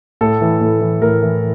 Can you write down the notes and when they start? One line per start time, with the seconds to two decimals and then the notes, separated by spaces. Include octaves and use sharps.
0.21 A2 A4
0.41 E3
0.61 A2
0.81 E3
1.02 A2 A#4
1.22 E3